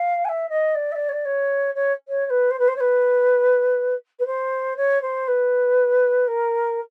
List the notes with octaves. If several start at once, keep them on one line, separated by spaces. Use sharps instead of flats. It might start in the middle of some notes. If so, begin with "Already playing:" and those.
Already playing: F5
G#5
E5
D#5
D5
E5
D5
C#5
D5
C#5
C#5
C#5
C#5
B4
C5
B4
C5
C#5
B4
B4
C5
C#5
C5
B4
A#4